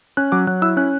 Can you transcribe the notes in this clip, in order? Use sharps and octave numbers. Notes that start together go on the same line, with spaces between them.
C#4 F#6
F#3 D6
F#3 F#6
E4 E6
C#4 F#6